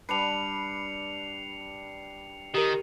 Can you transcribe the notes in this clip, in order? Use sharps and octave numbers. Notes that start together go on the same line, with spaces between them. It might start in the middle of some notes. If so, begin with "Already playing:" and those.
G3 D4 B4 C7 C#7 F7
D#3 G4 A#4